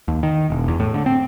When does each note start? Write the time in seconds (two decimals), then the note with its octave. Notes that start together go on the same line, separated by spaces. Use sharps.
0.08 D#2
0.23 D#3
0.50 E1
0.68 E2
0.80 A2
0.94 D3
1.06 C4